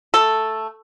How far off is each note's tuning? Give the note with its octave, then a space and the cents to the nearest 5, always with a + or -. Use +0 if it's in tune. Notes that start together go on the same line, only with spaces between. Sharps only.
A3 +5 A4 +0